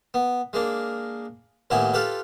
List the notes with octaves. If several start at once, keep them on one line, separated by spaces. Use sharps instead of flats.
B3
G#3 A#3 D4
A1 D#2 B3 E4 G4 G#5
F4 G4 A4 B4